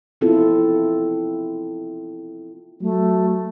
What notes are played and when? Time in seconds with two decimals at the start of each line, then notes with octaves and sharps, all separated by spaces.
0.21 B3 C4 E4 F4 A4
2.81 F#3 A3